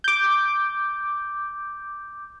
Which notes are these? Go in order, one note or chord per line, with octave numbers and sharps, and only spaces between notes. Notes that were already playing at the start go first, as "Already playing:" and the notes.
D6 G6